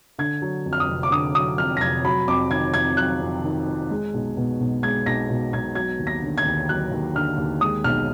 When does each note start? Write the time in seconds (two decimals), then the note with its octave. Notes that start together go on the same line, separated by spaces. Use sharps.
0.18 D3 G#6
0.42 F#3
0.66 F2
0.73 F6
0.80 D#6
0.88 F1
1.03 D6
1.11 D3 D#6
1.35 F#3 D#6
1.58 F2 F6
1.77 A#6
1.81 F1 G#6
2.05 F#3 B5
2.28 F2 D6
2.50 D#3 G#6
2.74 F2 G#6
2.97 F#3 F#6
3.21 F2
3.44 D#3
3.67 F2
3.91 G#3
4.14 B1
4.37 B2
4.60 B1
4.83 G#3 G#6
5.06 B1 A#6
5.30 B2
5.53 B1 G#6
5.75 F#3 G#6
5.99 D#2
6.07 A#6
6.22 D3
6.38 G#6
6.46 D#2
6.69 F#3 F#6
6.92 D#2
7.15 D3 F6
7.38 D#2
7.61 G#3 D#6
7.84 B1 F6